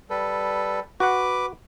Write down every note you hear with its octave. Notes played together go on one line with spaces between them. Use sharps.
G3 A4 B4
F#4 B4 F#5 D6